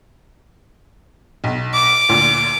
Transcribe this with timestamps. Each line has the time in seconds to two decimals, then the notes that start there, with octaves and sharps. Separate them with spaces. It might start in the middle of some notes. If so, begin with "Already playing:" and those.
1.44 B1
1.74 D6
2.09 D2 A#2 D3